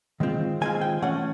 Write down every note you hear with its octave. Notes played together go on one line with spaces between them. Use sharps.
D#3 G#3 C4 F4
D#3 G#3 C4 F4 G#5
G5
E3 A3 C#4 F#5